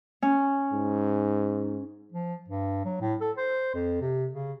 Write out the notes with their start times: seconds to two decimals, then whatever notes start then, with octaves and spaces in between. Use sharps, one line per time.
0.22 C#4
0.73 G#2
2.12 F3
2.48 G2
2.85 F#3
3.01 A2
3.21 A4
3.37 C5
3.74 F2
4.01 C3
4.31 C#3